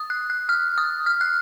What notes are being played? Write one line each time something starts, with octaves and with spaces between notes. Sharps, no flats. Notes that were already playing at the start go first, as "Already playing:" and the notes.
Already playing: D#6
F#6
F#6
F6
D#6
F6
F#6